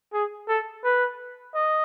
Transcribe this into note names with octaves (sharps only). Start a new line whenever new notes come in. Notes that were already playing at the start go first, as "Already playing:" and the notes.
G#4
A4
B4
D#5